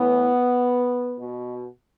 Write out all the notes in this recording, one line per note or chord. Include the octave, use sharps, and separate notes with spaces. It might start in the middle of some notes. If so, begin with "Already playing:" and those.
Already playing: A2 E3 B3
B2